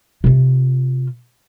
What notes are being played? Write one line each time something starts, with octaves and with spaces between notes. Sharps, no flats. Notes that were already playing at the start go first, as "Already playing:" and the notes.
C3 F4